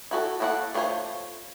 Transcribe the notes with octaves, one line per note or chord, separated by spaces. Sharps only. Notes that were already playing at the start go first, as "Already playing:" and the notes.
E4 F#4 A4
A#3 E4 A4 D#5 F#5
A3 D4 F4 C5 C#5